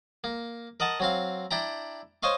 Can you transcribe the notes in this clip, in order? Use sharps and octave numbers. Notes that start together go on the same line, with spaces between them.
A#3
A#4 D#5 F#5 A5
F#3 C4 F5
D4 E4 G5 A#5
C5 C#5 D#5 F5 C#6